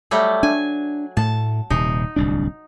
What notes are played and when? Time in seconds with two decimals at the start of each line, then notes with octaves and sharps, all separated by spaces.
0.11 F#3 G3 A3
0.43 D4 G#5
1.17 A2 A3 A5
1.70 D#1 C3 D#4
2.16 D1 C2 D4